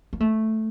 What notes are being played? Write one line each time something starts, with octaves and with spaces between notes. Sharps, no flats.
A#3
A3